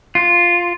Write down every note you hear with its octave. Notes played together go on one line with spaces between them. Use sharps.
F4